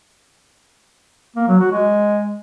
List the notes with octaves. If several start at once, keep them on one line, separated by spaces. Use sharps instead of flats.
A#3
F#3
F#4
G#3